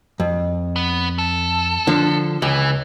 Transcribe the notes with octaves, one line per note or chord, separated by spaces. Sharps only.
F2
B3
A4
D3 F3
C#2 E3